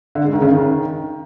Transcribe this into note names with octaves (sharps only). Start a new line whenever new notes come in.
D3
G#3
D#3
C#3
D#3